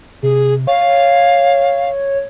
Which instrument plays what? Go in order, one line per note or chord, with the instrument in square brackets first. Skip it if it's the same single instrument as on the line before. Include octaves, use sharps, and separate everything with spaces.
[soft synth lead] C3 [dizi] G#4
[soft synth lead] C#5 [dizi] F5